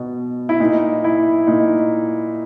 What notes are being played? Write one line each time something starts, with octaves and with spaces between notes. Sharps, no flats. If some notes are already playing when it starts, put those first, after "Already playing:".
Already playing: B2
E4
A#2 D#4
E4
A#2 D#4